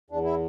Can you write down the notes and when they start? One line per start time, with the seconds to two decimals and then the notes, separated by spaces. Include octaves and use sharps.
0.10 E2 D4
0.24 E4